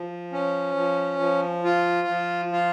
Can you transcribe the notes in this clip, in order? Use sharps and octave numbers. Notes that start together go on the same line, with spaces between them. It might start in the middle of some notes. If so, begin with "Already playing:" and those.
Already playing: F3
C#4
F3
F3
F4
F3
F4